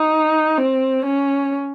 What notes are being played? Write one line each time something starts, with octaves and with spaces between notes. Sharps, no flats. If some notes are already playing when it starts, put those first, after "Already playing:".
Already playing: D#4
C4
C#4